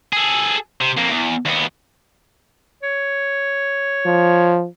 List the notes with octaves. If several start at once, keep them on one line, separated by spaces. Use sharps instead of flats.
G#4 A4
C3
F2 A#3
E2
D#2 B3
C#5
F3